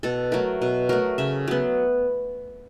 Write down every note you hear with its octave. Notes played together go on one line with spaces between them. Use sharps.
B2 A4
F#3 A3 A#4
B2
F#3 A3 A#4
C#3 E5
F#3 B3